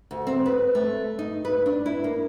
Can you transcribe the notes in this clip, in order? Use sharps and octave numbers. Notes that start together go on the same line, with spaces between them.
D2
C4
B4
A3
D#4
B4
D4
E4
A#3